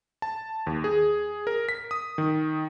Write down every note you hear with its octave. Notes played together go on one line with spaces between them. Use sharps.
A5
D#2
G#4
A#4
B6
D#6
D#3